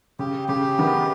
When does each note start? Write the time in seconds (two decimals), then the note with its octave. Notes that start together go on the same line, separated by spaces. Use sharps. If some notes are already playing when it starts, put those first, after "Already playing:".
0.19 C#3 G4
0.48 C#3 G4
0.78 D#3 B3